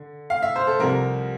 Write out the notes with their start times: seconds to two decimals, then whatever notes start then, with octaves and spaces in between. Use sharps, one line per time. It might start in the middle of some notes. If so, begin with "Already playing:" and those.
Already playing: D3
0.30 F5
0.42 E5
0.56 C5
0.67 A4
0.80 C2 C3 F3 A#4